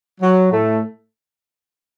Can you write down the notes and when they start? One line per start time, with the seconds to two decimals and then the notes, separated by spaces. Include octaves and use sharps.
0.21 F#3
0.52 A2 A3